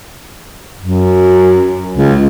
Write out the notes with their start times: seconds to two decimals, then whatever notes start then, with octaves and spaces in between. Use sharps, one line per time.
0.80 F#2
1.93 C#2